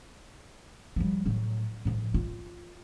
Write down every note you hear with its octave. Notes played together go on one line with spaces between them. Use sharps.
F3 G3
A2 F#3
A2 F3
F4